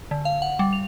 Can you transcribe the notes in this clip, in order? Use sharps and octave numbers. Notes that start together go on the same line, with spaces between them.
D3
F5
F#5
G3
F7